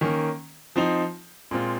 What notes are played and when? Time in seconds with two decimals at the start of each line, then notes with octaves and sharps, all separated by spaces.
0.01 D#3 A#3 C#4
0.76 F3 C4 D#4
1.51 A#2 G#3 C4 F4